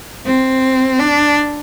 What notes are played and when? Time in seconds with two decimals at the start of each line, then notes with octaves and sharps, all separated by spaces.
0.25 C4
0.99 D4